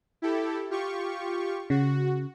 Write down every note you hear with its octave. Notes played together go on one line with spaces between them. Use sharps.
E4 G4 A4
F4 G4 C#6
C#3 F#4